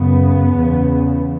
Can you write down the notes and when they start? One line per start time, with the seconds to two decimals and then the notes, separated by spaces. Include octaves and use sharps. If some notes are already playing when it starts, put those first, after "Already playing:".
Already playing: F#2 C#3 B3
0.56 E2 C#3